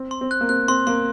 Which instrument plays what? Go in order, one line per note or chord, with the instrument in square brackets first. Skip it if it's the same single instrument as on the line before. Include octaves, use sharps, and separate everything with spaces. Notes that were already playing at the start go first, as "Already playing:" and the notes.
Already playing: [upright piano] C4
[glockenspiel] C6
[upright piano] C4
[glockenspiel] F#6
[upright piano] A#3
[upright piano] C4 [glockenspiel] F#6
[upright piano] C4 [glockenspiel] C6
[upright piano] A#3 [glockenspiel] C6